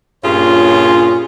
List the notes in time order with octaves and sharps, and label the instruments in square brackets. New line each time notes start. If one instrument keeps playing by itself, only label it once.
[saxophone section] G2 A#2 C#4 F4 G#4 C#5